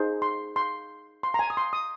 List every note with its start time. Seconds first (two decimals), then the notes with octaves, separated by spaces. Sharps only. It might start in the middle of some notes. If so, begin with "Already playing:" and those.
Already playing: D#4 G#4 C5
0.22 C6
0.56 C6
1.23 C6
1.34 A#5
1.39 G#5
1.50 D#6
1.57 C6
1.73 D#6